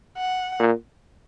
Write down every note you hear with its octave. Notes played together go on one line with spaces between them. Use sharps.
F#5
A#2